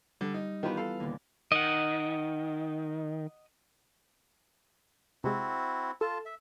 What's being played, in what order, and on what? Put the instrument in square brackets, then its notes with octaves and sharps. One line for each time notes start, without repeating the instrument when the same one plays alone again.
[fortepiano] D3 [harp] G3
[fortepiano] D#4
[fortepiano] D#3 G4 B4 [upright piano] E3 B3 F4
[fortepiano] A4 B4 F5
[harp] D#2 A#2 D3
[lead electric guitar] D#3 [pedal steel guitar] D#5 F#5
[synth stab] C3 G#3 [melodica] C4 E4 F#4
[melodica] F4 A5 [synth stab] A4
[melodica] E5